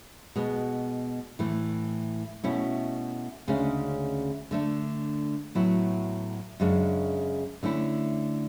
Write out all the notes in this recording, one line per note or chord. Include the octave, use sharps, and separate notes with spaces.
B2 G#3 B3
A2 E3 A3
B2 A3 C#4 E4
D2 C#3 G#3 C#4
D3 A3 D4
A2 F#3 B3 E4
F#2 C#3 G#3 D4
D3 A3 C#4 E4